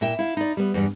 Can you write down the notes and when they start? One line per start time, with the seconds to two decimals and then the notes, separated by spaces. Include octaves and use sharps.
0.01 A#2 E4 E5 G5
0.19 E4 F5
0.37 D#4 D5
0.57 G3 B3
0.74 E2 G2 G3